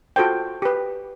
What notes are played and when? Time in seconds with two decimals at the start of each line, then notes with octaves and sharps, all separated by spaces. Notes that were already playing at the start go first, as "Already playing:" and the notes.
0.16 F4 F#4 A4 C5 G5
0.62 G4 B4